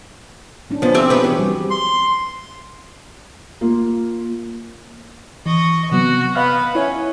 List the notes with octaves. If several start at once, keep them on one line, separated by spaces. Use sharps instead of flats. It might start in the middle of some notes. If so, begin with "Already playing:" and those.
F3 C#4 D4
F3 B3 C5
C4 G4 E5
B3 F#4 G#4 B4
E3 G4
F3 G3 C4
C6
A#3 F4
E3 D#5 C#6
C3 F#3 B3 F#4
B3 B4 D#5 F5 F6
C#4 E4 C#5 E5